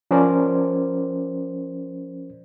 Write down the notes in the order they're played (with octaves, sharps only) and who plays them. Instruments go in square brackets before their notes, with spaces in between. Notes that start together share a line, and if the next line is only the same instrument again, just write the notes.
[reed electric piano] F3 C#4 A#4 C5 D5